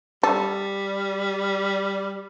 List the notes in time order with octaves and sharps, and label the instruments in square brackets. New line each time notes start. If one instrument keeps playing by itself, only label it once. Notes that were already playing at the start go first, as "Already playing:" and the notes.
[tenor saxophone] G3 [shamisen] A4